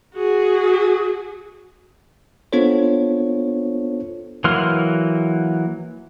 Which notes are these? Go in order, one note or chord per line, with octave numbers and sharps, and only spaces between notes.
F#4 G#4
B3 D4 F4 A4 C5 C#5
E3 F#3 A#3 C6 F6